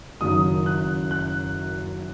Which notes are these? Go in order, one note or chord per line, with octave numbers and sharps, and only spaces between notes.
F#1 F#2 D#3 F#3 D#6
F#6
F#6